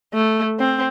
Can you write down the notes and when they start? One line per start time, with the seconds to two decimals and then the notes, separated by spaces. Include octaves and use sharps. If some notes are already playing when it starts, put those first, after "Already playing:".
0.14 A3
0.60 C4